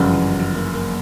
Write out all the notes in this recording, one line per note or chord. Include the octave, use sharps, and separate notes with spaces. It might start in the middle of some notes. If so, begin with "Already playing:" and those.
Already playing: G1 F#2 C#3 F3
E3
F#3
A#3
A#3